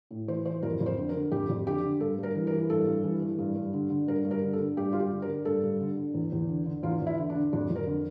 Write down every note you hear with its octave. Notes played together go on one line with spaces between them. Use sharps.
A2
E3 C5
E3 C5
F2 A#4
F2
C5
D3
A#4
D3
F2 G4
F2
D3 G4
D3
G2 A4
G2 A#4
E3
A#4
E3
G2 A4
G2
E3
E3
G2
G2
D3
D3
G2 A#4
G2
A#4
D3
A4
D3
G2 G4
G2 F4
G4
D3
A#4
D3
G2 A4
G2
D3
D3
E2
E2
D3
D3
E2 F4
E2
E4
D3
D4
D3
F2 D4
F2
A#4
D3